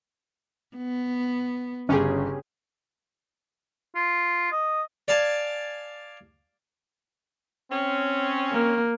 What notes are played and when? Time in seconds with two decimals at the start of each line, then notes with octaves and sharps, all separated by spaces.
0.77 B3
1.89 G1 C#3 C#4 G4 G#4
3.95 F4
4.52 D#5
5.08 D5 F5 G#5 A5
7.71 C4 C#4
8.52 A#3